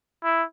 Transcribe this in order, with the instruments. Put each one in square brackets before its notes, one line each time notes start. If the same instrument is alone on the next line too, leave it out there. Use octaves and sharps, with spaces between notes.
[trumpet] E4